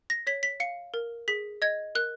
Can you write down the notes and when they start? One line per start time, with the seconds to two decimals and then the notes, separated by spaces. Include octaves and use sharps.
0.10 A#6
0.27 C#5 B6
0.43 B6
0.60 F5 C#7
0.94 A#4
1.28 G#4 B6
1.62 D#5 G#6
1.95 A#4 F#6